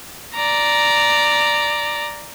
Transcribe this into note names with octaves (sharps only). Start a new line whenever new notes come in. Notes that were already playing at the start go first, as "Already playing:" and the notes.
D5 A#5